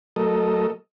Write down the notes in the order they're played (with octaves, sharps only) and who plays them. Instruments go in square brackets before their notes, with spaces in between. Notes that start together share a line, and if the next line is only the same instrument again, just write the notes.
[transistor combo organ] F#3 A3 A4 A#4 D#5